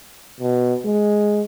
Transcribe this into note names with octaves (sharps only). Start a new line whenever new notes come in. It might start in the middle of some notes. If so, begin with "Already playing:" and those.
B2
G#3